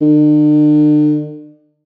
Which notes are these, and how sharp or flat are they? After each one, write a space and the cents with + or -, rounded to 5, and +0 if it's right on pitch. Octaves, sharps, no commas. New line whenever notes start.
D3 +40